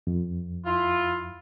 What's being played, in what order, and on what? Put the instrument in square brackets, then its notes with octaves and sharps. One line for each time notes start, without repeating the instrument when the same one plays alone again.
[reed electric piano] F2
[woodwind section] E4 F4